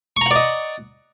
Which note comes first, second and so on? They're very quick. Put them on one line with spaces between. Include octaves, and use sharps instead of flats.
C#6 A#5 F#5 D5 D#5